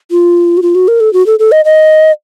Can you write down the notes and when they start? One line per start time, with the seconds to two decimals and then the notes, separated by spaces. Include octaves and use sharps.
0.11 F4
0.57 F#4
0.62 F4
0.75 F#4
0.88 A#4
1.00 A4
1.13 F#4
1.26 A4
1.39 A4
1.52 D#5
1.65 D#5